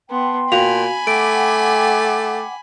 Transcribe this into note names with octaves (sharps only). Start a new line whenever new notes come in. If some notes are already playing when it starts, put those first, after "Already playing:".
B3 G5 A5 C6
A#2 F#4 F5 G#5 B5 F7
A3 F#5 G5 D6 D7